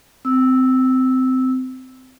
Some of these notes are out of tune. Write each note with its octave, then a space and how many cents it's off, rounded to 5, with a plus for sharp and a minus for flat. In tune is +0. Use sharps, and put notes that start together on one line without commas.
C4 -20 E6 -10